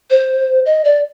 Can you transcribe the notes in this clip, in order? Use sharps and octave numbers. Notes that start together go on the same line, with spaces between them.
C5
D#5
D5